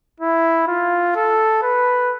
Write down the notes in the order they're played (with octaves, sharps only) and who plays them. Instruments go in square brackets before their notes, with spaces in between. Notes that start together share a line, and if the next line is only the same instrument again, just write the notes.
[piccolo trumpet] E4
F4
A4
B4